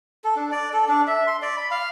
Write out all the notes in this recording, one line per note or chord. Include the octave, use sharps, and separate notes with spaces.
A4
D4
D5
A4
D4
E5
C6
D5
B5
F5